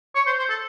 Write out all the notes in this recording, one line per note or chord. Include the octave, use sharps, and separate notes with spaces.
C#5
C5
C5
A4